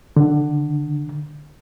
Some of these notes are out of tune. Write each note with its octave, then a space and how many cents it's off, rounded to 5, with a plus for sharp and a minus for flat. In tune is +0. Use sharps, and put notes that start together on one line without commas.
D3 +15